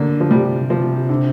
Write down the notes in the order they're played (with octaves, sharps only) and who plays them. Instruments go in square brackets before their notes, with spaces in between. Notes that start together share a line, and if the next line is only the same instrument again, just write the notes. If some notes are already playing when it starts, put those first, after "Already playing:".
Already playing: [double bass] D3 [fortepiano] A#3
[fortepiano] F3
[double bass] C3 [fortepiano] G3
[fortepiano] F3
D3